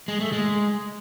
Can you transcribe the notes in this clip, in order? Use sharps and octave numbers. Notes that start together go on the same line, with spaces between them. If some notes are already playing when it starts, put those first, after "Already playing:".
G#3
A3
G#3